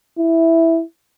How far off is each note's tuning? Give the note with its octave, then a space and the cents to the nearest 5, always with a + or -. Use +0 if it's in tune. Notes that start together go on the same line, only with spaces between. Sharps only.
E4 -5